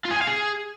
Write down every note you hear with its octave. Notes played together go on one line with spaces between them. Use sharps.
F4
G#4
G#5
F5
G#4